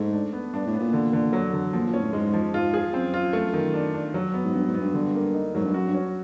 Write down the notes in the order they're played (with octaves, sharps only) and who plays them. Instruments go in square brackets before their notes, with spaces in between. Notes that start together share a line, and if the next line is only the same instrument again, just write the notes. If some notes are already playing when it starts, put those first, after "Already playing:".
Already playing: [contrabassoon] G#2 [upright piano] A3
[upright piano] D4
B3
[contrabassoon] G2 [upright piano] D4
[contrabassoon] A2
[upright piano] B3
[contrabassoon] A#2
[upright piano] D3
D3
F#3
D3
[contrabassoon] A#2 [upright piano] F3
[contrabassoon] A#2
[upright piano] C#4
[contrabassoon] A2
[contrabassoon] G#2 [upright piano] G#3
[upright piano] F3
[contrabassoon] G#2 [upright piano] F4
[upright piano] G#4
[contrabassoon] F#2 [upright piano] C4
[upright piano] F4
A3
D#3
D4
D4
F#3
B3
[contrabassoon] G#2
[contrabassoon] G2 [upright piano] B3
[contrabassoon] G#2
[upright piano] B3
[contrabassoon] G2
[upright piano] D3
A#3
D#4
[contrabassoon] G#2 [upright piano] F#3
[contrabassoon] G2
[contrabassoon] F#2 [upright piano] F#4
[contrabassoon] G2
[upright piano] C#4